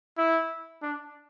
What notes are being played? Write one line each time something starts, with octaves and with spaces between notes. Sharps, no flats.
E4
D4